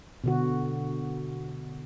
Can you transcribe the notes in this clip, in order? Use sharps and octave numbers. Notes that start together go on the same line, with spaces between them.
B2 D3 F#4